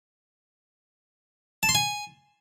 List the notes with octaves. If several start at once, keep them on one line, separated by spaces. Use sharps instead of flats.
A5
C6
G#5